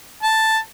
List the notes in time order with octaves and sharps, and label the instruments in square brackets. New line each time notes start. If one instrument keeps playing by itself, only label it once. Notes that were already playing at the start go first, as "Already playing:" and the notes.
[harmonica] A5